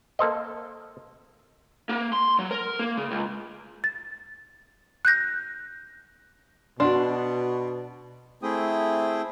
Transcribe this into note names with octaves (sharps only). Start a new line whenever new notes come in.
A#3 A4 C5 D#5
A#3
C6
F#3
A#4
A#3
C#3
C#2
A6
F#6 G6 A#6
B2 D4 F#4 C6
A3 C4 E4 G#4 G5 D#6